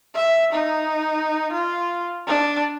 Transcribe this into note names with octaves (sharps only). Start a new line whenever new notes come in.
E5
D#4
F4
D4